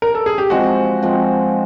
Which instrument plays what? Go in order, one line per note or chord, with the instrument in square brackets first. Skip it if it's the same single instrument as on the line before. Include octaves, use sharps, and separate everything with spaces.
[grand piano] A#4
A4
G#4
G4
[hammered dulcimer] F3 G#3 C4 [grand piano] F#4
[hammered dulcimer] F3 G#3 C4